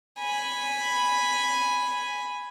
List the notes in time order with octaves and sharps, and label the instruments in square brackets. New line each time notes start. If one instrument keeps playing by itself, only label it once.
[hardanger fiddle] G#5 B5